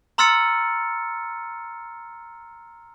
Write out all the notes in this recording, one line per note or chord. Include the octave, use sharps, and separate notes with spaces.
A#5 C6 E6 F6 A6 C#7